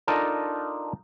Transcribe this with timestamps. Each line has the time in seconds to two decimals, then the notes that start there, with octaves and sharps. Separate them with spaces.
0.08 D4 D#4 F4 A4 A#4